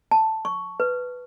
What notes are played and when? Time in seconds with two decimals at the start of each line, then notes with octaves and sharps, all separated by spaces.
0.11 A5
0.45 C#6
0.80 B4